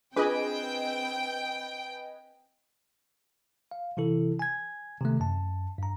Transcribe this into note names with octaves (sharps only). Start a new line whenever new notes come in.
C4 D4 F4 G#4 B4 D#5 G5 G#5
F5
C3 E3 E4 A4
G#5 G#6
C3 D#3 A3
F#2 A5
G2 A#5